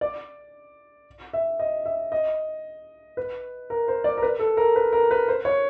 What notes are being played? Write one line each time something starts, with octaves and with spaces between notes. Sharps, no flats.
D5
E5
D#5
E5
D#5
B4
A#4
C5
D5
A#4
B4
A4
A#4
B4
A#4
B4
C5
C#5